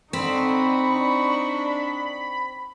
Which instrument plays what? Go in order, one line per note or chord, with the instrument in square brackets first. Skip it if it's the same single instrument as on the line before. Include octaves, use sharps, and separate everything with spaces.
[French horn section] D3 [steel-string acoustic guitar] C4 [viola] D#4 C#6 [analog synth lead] B5
[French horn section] D4